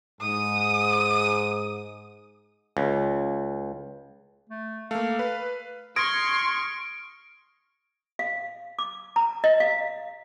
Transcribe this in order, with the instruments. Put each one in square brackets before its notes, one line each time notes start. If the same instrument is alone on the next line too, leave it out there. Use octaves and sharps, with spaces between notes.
[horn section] G#2 [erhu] D#6
[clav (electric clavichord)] C#2
[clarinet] A3
[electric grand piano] A3 A#3 [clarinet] F5
[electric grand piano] B4
[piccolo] C6 [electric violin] C#6 F6 [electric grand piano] D#6 G#6 A#6 [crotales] D7
[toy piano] F5
D6
A#5
D#5
F5